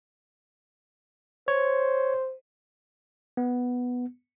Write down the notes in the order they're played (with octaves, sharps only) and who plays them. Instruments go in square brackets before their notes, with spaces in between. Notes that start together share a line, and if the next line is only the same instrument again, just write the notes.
[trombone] C5 [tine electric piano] C#5
[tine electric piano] B3